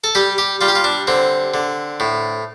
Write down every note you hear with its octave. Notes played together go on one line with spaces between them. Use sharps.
A4
G3 G4
G4
G3 F4
G4
F4
D4
D3 C4
D3
A2